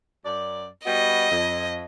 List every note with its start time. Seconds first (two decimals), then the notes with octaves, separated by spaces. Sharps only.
0.25 F#2 D5
0.85 G3 B3 F#4 D#5
1.30 F2